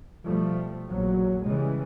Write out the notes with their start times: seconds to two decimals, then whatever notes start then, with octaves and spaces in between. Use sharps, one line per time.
0.24 B2 F3 G3 A3
0.88 A#1 E2 A#2 F#3
1.43 C#3 E3 G3 G#3